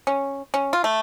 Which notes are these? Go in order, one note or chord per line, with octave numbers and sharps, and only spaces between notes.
C#4
C#4
F4
A3